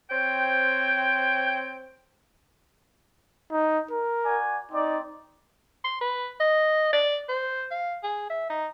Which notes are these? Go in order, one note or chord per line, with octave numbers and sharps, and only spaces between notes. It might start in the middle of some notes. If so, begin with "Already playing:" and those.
C4 C5 C#5 G5
D#4
A#4
F#4 D5 G#5
C4 D#4 D5
C6
B4
D#5
D5
C5
F5
G#4
E5
D#4